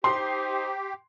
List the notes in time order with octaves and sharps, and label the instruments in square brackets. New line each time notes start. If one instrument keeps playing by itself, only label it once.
[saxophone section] D#4 C5 [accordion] G4 [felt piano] C6